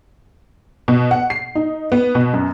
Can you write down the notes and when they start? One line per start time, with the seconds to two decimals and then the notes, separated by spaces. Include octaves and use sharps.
0.88 B2
1.11 F#5
1.30 C7
1.55 D#4
1.92 B3
2.15 B2
2.34 F#2